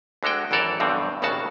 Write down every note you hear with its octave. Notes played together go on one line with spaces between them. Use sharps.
D2 D3 G#3 F#4 G5
G#1 F#2 E3 A4 A#4 D5
B1 E2 G2 B2 D3 C4
G#1 D#2 A2 C#3 F#4 A5